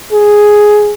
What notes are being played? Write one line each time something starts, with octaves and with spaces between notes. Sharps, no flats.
G#4